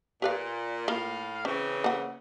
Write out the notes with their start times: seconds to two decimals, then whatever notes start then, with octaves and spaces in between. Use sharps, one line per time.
0.22 A#2 G4 B4 F5
0.88 A2 A#3 F4 F5
1.45 C#3 E3 C4 C#4
1.84 A#3 F#5